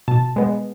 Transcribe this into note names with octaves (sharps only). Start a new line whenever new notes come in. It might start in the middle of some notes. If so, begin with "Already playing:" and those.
B2 A5
G#3 B3